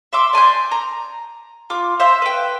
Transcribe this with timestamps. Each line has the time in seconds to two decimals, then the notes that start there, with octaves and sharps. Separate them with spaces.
0.13 E5 C6 D6 E6
0.33 D5 G#5 C6 G6
0.71 A#5
1.70 F4 D6
2.00 C5 E5 F5 C6
2.22 B4 G5